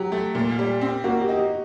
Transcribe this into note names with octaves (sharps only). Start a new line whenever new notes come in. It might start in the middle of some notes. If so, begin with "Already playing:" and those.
Already playing: F#3 G4
A3
A#2
G3
C4
A#3 F#4
G4
D#4
G4